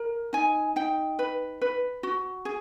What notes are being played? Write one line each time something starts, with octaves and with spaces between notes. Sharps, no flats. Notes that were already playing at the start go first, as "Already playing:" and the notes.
Already playing: A#4
D#4 G#5
D#4 G5
B4
B4
F#4
G#4